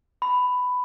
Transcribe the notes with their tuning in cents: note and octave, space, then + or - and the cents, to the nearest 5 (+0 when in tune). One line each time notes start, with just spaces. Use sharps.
B5 +10